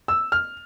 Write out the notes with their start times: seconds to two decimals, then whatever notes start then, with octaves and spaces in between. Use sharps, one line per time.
0.08 E6
0.32 F6